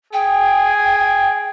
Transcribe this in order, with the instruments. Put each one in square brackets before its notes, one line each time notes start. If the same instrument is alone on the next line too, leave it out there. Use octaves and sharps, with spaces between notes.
[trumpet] G#4 [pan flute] G5